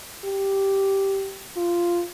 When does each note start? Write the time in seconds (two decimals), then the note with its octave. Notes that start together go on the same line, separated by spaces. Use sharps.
0.25 G4
1.57 F4